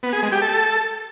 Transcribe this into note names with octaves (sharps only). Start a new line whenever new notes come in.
B3
G#4
G#3
G4
A4